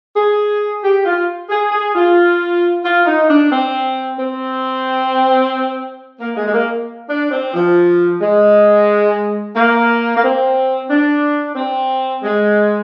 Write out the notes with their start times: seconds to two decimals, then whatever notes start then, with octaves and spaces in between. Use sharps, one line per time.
0.15 G#4
0.82 G4
1.04 F4
1.49 G#4
1.71 G#4
1.94 F4
2.83 F4
3.06 D#4
3.28 D4
3.50 C4
4.18 C4
6.19 A#3
6.35 G#3
6.46 G#3
6.53 A#3
7.08 D4
7.30 C4
7.53 F3
8.21 G#3
9.55 A#3
10.15 A#3
10.21 C4
10.88 D4
11.55 C4
12.23 G#3